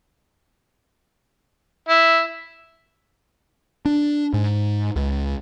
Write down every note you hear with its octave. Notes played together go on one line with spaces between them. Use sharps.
E4
D4
G#2
C#2